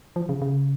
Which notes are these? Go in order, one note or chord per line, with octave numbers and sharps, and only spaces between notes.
F3
C#3
C#3